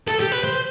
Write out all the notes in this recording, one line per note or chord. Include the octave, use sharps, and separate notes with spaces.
A4
G4
B4
C5